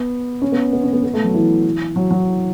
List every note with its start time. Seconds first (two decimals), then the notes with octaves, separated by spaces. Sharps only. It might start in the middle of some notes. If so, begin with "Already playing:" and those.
Already playing: B3
0.42 C#4
0.52 B3
0.73 B3
0.83 C#4
0.93 B3
1.03 B3
1.13 A3
1.24 F#3
1.34 E3
1.96 F#3
2.11 F#3